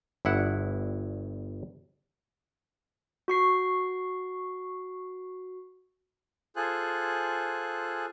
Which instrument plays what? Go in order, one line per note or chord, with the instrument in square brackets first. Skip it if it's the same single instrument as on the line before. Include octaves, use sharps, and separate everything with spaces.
[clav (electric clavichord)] G1 G2 E4 F#5
[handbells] F#4 C#6 C7
[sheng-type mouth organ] F4 G#4 A4 C5 G#5 F#6